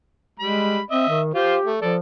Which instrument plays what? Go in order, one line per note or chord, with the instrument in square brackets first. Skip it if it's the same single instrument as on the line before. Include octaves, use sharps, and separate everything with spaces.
[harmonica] G3 B5 [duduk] G#3
[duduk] C4 [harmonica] D#5 E5
[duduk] D#3
[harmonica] F4 C5 [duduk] G4
[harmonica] A3
[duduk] F3 [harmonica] A4 D5